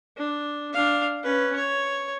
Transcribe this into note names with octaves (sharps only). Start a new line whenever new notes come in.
D4
D4 F5
C#4 B4
C#5